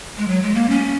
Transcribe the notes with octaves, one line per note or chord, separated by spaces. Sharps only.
G#3
F#3
G#3
A#3
C#4